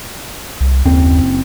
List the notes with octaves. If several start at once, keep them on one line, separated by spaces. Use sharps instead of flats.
C2
F#1 D#2 C4